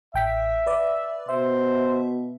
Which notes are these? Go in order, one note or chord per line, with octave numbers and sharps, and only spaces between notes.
A1 E5 G5 B6
B4 D5
B2 C5 E5